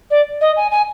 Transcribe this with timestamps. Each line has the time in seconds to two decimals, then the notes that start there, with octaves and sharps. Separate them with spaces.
0.10 D5
0.41 D#5
0.56 G#5
0.71 G#5